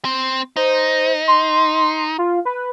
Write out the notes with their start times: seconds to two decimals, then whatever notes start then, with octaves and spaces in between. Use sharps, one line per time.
0.05 C4
0.56 D#4 C5
1.27 C6
2.18 F4
2.45 B4